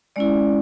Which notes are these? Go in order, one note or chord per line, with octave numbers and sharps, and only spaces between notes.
G#3 C#4 E4 D5